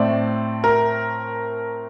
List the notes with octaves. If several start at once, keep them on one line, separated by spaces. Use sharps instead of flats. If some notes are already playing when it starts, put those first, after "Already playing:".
Already playing: A2 A3 C4 D5
A#4